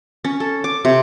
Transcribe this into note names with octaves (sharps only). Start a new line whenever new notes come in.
C#4
A4
D6
C3